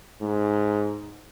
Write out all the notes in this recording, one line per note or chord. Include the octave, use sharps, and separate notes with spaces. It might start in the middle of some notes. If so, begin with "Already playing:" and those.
G#2